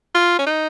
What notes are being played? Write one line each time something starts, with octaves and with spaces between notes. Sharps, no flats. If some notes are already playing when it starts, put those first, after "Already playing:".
F4
C#4
D#4